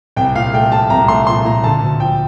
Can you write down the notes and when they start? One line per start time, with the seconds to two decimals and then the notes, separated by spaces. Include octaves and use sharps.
0.17 C2 G5
0.35 A#2 F5
0.54 A3 G5
0.72 A3 A5
0.90 C2 A#5
1.08 A3 C6
1.27 A#2 C6
1.45 A#2 A#5
1.64 D3 A5
1.83 D2
2.00 F3 G5